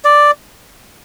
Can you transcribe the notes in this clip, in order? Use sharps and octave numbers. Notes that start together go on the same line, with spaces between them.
D5